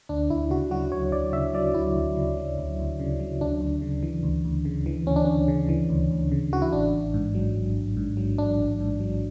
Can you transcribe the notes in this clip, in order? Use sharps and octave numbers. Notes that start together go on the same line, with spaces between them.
D2 D4
D2 E4
C#3 F#4
F#3 F#4
D2 C#5
D2 D5
C#3 E5
F#3 D5
D2 E4
D2
C#3
F#3
D2
D2
C#3
F#3
D2 D4
D2
C#3
E3
D2
D2
C#3
E3
D2 C#4
D4
D2 C#4
C#3
E3
D2
D2
C#3
E3 F#4
E4
A1 D4
A1
G#2
F#3
A1
A1
G#2
F#3
A1 D4
A1
G#2
F#3